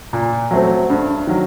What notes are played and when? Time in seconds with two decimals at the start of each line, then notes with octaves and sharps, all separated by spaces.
0.13 A#2
0.51 F#3 A3 C4
0.90 G2
1.27 D#3 F#3